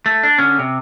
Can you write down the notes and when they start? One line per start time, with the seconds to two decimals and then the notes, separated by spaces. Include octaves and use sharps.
0.06 A3
0.23 D4
0.38 D3 C#4
0.59 C3